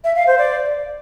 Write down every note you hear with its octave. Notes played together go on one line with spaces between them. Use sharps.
E5
F5
C5
D5